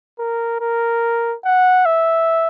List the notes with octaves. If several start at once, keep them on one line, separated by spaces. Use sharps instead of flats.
A#4
A#4
F#5
E5